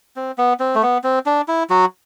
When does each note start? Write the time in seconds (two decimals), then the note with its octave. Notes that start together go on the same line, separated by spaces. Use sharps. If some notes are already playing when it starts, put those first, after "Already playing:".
0.16 C4
0.38 B3
0.60 C4
0.75 A3
0.82 B3
1.04 C4
1.26 D4
1.48 E4
1.70 F#3 F#4